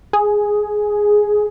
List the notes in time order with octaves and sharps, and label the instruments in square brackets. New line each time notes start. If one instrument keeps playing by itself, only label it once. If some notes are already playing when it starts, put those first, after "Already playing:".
[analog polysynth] G#4